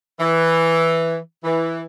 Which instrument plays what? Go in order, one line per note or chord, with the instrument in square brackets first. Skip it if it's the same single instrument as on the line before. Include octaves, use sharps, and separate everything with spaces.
[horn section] E3
E3